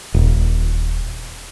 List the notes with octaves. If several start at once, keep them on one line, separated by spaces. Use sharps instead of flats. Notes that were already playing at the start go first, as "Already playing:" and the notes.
D#1